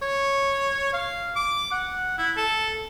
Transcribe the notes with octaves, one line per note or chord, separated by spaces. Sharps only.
C#5
F5
D6
F#5
E4
A4